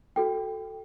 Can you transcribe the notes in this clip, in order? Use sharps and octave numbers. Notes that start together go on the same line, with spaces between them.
F#4 A4 G5